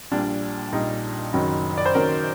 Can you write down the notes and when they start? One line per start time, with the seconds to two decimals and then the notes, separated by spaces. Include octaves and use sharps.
0.12 A#1 A#2 G3 D4
0.72 A#1 A#2 G3 D#4
1.33 F#1 F#2 D#3 F#3
1.77 D5
1.86 C5
1.94 F#1 F#2 D#3 F#3 A#4